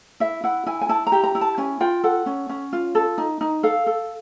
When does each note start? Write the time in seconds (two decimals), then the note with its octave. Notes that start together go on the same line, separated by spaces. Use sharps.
0.20 E4 E5
0.44 E4 F#5
0.67 E4 G#5
0.81 G#5
0.89 E4 A5
1.07 A#5
1.12 G4
1.24 A#5
1.35 E4
1.41 A5
1.58 C#4 G#5
1.80 F4 G5
2.04 A4 F#5
2.26 C#4
2.49 C#4
2.73 F4
2.95 A4
3.18 D#4
3.41 D#4
3.63 A4 F5
3.87 A4